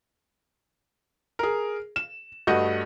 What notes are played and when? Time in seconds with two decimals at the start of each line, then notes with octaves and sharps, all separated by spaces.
1.39 G#4 A#4
1.96 E7
2.47 G2 A3 F#4 D#5 F#5 G6